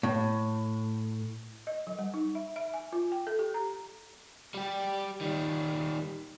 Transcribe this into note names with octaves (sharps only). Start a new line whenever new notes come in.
A2
D#5
F#3
G3
D#4
E5
E5
G#5
F4
G5
A4
G4
A#5
G3 G4
D#3 G3